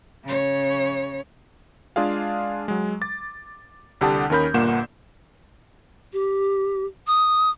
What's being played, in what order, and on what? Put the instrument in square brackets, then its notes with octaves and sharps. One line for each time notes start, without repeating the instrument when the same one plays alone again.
[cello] C#3 C#5
[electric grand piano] G#3 D4 F4 G#4 F5
F#3 G#3
D6 A6
C2 D3 G4 F#5 A5 D#6
D#2 D#3 C#4 A#4 B5 G6
G1 G2 A#2 A#3 F#5 E7
[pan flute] G4
D#6